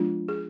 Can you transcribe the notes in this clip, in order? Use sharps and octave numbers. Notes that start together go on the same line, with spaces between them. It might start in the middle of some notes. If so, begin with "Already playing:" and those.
Already playing: F3 G#3 B3 D4 F4
G#4